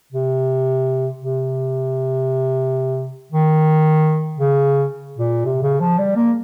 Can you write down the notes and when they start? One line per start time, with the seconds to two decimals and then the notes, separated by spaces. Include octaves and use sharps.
0.13 C3
1.19 C3
3.32 D#3
4.38 C#3
5.18 A#2
5.46 C3
5.63 C#3
5.80 F3
5.98 G3
6.16 A#3